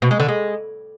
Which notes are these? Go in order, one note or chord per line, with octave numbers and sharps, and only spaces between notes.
B2
G#3
D3
G#3